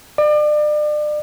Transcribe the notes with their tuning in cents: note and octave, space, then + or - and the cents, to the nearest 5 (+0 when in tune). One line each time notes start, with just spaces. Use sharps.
D5 +35